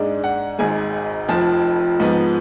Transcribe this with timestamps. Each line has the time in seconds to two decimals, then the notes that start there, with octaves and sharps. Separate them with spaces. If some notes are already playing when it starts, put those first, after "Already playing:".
Already playing: G#2 G#3 D4
0.24 F#5
0.59 G#1 G#2 G#3 G#5
1.29 F1 F2 F3 A5
2.00 G#2 F3 B3